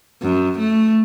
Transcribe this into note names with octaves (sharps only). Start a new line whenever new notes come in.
F#2
A3